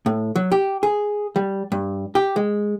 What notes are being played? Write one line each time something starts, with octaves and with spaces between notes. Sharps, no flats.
A2
F#3
G4
G#4
G3
G2
G4
G#3